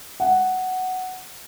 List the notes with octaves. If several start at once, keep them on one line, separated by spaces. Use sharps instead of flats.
F#5